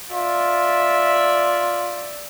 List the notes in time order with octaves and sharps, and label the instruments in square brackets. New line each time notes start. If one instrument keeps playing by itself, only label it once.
[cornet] F4 [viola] D5 E5